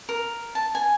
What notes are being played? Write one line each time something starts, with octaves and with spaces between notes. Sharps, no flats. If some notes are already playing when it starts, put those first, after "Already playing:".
A#4
A5
G#5